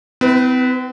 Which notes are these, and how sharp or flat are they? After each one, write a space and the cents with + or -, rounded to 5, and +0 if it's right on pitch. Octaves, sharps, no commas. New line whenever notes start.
C4 -45 E4 -20 B4 +0